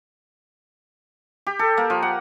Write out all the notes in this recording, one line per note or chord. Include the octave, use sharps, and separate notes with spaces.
G4
A4
A#3
F3
F#5